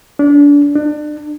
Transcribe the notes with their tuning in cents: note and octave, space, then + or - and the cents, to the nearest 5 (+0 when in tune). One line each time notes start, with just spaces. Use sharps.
D4 -30
D4 +30